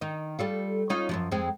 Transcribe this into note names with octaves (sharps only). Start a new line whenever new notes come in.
D#3 D#4
G3 A3 F4
C#4 D#4 F4
F#2 B2 F3
F2 G#3 C4